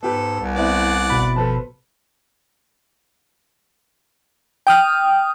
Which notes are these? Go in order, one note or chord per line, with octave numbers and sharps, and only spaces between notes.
G#2 B3 G4 A4 B4
C2
B3 C4 E4 D5 F#5
G1 B2 B5
F3 A4 B4 A5
G5 D#6 F6